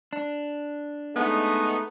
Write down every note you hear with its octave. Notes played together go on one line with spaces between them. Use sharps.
D4
G#3 A3 B3 D#4